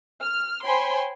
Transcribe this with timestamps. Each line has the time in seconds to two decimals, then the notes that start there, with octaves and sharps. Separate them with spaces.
0.24 F6
0.65 C5 C#5 G5 G#5 B5 C6